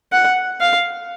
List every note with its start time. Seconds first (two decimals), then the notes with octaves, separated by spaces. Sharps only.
0.12 F#5
0.60 F5